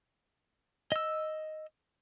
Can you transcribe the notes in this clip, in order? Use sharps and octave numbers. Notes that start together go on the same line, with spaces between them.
D#5 E6